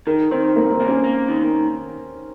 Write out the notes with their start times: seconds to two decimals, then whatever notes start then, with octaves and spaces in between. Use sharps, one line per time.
0.07 D#3 A#4
0.31 D#3 C4
0.56 C2 A#3
0.72 C4
0.80 A#3
0.88 C#4
1.04 A#3
1.28 D#3